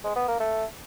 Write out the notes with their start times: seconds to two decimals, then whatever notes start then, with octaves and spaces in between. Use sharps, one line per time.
0.04 G#3
0.16 B3
0.28 A#3
0.40 A3